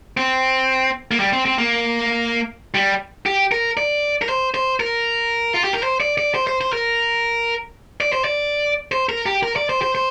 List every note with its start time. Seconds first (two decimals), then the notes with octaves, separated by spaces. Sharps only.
0.17 C4
1.11 A#3
1.20 G3
1.33 C4
1.45 C4
1.58 A#3
2.74 G3
3.26 G4
3.52 A#4
3.77 D5
4.22 A#4
4.29 C5
4.54 C5
4.80 A#4
5.54 F4
5.64 G4
5.73 A#4
5.83 C5
6.00 D5
6.18 D5
6.35 C5
6.47 C5
6.61 C5
6.73 A#4
8.01 D5
8.13 C5
8.24 D5
8.92 C5
9.09 A#4
9.26 G4
9.43 A#4
9.56 D5
9.69 C5
9.82 C5
9.95 C5